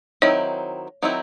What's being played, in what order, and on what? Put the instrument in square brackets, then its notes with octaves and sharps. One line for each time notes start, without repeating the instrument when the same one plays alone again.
[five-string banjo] D#3 F#3 C4 E4 [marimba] C#5
[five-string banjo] D#3 F#3 C4 E4